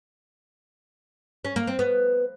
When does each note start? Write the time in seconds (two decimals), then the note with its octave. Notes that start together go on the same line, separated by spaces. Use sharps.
1.45 C#4
1.56 A#3
1.67 C4
1.79 B3